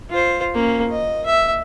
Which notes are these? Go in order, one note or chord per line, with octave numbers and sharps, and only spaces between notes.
F4 C5
A#3 C#4
D#5
E5